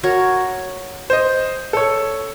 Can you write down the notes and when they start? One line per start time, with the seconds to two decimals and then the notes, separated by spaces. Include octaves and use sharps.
0.03 F#4 A#4 C#5
1.10 C5 D#5
1.73 A4 C#5